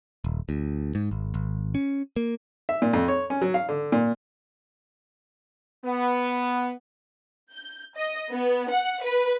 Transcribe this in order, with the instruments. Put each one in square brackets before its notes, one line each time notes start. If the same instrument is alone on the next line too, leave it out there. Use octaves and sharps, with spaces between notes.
[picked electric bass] D#1
D2
G#2
G#1
G#1
C#4
A#3
[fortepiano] E5
A#2
F2
C#5
C#4
F#3
F5
D3
A#2
[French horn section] B3
[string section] G6
D#5
B3
F#5
B4